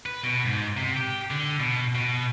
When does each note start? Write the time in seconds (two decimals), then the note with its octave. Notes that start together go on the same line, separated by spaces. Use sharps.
0.06 B4
0.23 B2
0.46 G#2
0.77 C3
0.97 G4
1.31 D3
1.60 B2
1.95 B2